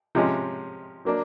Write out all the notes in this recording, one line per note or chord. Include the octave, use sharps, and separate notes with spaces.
C3 F3 G#3 C#4
F#3 A#3 D4